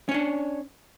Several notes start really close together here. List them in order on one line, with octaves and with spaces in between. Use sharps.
C#4 C#5 D4